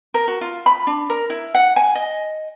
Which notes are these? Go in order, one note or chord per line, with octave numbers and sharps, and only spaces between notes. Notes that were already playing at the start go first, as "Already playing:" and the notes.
A#4
F#4
F4
B5
D4
A#4
E4
F#5
G#5
D#5